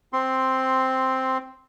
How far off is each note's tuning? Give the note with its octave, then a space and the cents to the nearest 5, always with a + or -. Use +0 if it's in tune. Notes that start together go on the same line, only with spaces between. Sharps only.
C4 +0 C6 +5